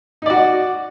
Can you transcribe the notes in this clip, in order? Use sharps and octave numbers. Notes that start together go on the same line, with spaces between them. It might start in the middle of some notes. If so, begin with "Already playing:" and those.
D#4 F#4 D5